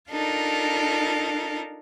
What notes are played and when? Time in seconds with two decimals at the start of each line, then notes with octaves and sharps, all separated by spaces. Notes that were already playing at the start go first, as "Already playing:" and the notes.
0.10 D4 D#4 F4 A4 A#4